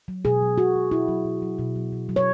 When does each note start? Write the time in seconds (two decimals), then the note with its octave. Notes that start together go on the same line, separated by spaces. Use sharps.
0.08 F#3
0.25 B2 G#4
0.42 F#3
0.58 B2 F#4
0.75 F#3
0.92 B2 E4
1.08 F#3
1.24 B2
1.42 F#3
1.59 B2
1.76 F#3
1.92 B2
2.09 F#3
2.16 C#5